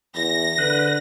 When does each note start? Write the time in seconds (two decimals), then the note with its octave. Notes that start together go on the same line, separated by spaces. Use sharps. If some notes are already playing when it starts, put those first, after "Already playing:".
0.16 E2 A#6
0.58 D3 B4